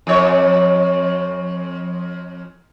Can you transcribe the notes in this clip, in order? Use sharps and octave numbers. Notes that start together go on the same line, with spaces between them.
F2 C#5